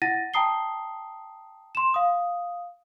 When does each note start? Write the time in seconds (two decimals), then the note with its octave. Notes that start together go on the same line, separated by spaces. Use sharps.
0.02 E4 F#5 A6 A#6 D#7
0.34 G5 A5 A#5 D#6 C7 G7
1.75 C6 E7
1.94 F5 D#6